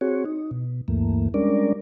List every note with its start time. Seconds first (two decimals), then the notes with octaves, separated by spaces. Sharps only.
0.01 C4 F#4 G#4 C#5
0.25 D#4
0.51 B2
0.88 D2 G2 E3 A3 A#3
1.34 G3 G#3 C#4 D4 A#4 D5